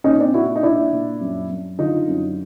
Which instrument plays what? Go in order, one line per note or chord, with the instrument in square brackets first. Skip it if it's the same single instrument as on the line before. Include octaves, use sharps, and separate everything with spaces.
[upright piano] A#2 C#4 D#4
C4 D4
A#2 E4 F#4
D#4
A#2 D4 E4
A#2
F#2
F#2
D3 D#4 F4
F#2